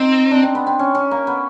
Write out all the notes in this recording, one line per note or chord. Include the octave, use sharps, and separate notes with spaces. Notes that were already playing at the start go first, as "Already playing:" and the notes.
Already playing: C4 D#4
D4
C4
B3
C4
C#4
C#4
A#3
B3